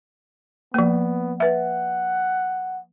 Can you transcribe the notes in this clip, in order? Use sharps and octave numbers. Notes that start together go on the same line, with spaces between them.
F3 A#3 B3
B4 E5 F#5